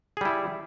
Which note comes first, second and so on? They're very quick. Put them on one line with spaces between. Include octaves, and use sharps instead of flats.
G#4 G3 E4